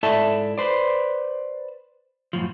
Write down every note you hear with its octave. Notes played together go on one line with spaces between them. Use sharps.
G#2 E4 A4 D5 E5 A5
B4 C5 D5
F#2 A2 F3